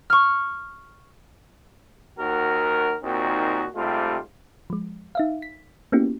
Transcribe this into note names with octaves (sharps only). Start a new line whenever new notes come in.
C#6 F6
D#2 F#4 A#4
D#2 A#2 D#3 C4 D#4 F#4
G#2 C3 G3 A3 F4
F3 G#3
D#4 E5 F5
B6
A#3 B3 C#4 E4 F#4 G4